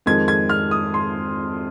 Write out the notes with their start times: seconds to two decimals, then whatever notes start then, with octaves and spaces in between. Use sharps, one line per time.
0.06 F2 D#3 G#3 G#6
0.28 G#6
0.49 F6
0.71 D#6
0.94 C6